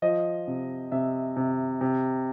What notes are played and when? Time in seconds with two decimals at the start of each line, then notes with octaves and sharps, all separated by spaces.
0.02 F3 D#5
0.48 C3
0.92 C3 E5
1.37 C3
1.81 C3